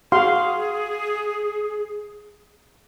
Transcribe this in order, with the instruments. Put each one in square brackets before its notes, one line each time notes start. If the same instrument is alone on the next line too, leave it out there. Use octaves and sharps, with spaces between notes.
[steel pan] F#4 F5 C6 [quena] G#4